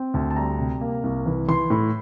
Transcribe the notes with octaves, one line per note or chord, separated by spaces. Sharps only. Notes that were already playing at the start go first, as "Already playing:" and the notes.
Already playing: C4
D2 A5
A5
G3 A#5
C3
A#3
C2
E3
E3 C6
A2